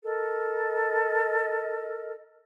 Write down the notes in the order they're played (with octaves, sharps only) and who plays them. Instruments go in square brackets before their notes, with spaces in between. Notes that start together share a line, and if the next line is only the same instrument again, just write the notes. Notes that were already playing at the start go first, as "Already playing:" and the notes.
[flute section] A4 A#4 D#5